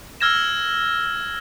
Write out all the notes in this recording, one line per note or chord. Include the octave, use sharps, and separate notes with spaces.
E6 F6 G#6 A#6 E7